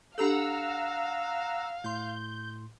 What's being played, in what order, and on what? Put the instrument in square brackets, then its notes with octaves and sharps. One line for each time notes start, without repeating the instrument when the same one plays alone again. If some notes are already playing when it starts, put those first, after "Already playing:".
[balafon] D4 G4 A4 [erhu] F5 [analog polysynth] F#5 A#5 E6
[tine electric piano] A2 C6 [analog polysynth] G6